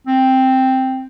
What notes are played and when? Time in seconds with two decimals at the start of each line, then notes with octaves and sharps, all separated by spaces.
0.07 C4